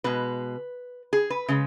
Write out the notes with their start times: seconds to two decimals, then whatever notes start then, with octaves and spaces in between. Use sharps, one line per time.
0.04 B2 G#3 B4
1.13 G#4
1.30 B4
1.48 C#3 G#3